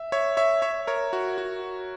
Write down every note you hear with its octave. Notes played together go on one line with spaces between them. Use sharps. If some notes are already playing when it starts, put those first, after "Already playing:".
Already playing: E5
C#5 E5
C#5 E5
C#5 E5
A#4 C#5
F#4
F#4